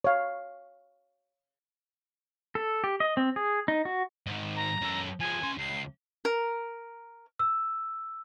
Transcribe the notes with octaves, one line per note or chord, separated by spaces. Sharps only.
C#5 F5
A4
G4
D#5
C4
G#4
D#4
F#4
G#2 D#3
A#5
F#2 A4
F3 G#3 G#5
C#4 C6
C#2 C7
A#4
E6